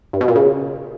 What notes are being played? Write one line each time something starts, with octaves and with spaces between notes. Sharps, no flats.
G2
B2
A#2
C#3